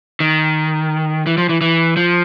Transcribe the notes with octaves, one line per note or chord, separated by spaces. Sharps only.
D#3
E3
F3
E3
E3
F3